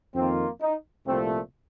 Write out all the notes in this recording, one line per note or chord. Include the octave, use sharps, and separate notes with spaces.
F2 D#3 A#3 C4 F4
D#4
C2 A#2 F3 A3 C4